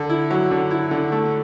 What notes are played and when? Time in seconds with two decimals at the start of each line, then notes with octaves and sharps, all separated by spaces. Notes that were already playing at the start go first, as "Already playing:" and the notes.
Already playing: D3
0.10 E4
0.31 F#3
0.51 D3
0.71 E4
0.91 D3
1.12 A3